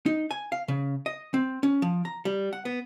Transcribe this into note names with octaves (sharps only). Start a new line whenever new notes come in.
D#4
G#5
F5
C#3
D#5
C4
C#4
F3
A#5
G3
F#5
B3